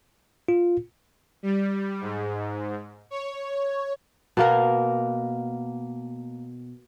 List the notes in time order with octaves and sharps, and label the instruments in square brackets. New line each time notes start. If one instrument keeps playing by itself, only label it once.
[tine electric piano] F4
[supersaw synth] G3
G#2
C#5
[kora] B2 A#3 A#4